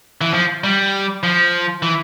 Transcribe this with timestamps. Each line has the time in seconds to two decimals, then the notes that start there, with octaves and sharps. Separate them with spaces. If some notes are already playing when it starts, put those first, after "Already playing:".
0.21 E3
0.33 F3
0.64 G3
1.23 F3
1.82 E3